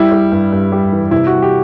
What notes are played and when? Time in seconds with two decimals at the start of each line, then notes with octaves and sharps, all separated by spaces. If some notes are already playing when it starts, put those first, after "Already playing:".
Already playing: G3 E4
0.12 G3
0.32 G2
0.52 G2
0.72 G3
0.92 E3
1.11 C3 E4
1.27 G3 F#4
1.42 G4